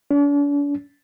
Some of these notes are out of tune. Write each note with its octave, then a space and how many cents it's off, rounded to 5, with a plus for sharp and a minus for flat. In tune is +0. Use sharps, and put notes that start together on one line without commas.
D4 -45